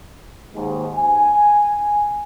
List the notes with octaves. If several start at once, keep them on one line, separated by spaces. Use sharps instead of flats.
D#2 G#2
G#5